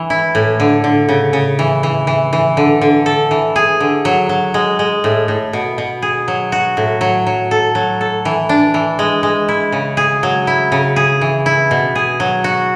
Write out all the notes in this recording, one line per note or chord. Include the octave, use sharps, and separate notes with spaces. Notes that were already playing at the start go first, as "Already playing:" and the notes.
Already playing: E3
E4
A2
D3
D3
C#3
C#3
E3
E3
E3
E3
D3
D3
A4
E3
G#4
D3
F#3
F#3
G#3
G#3
A2
A2
B2
B2
G#4
F#3
F#4
A2
F#3
F#3
A4
F#3
A4
E3
D4
E3
G#3
G#3
E4
C#3
G#4
F#3
E4
C#3
G#4
E3
E4
B2
G#4
F#3
F#4